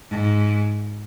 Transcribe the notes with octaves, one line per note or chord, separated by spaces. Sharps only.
G#2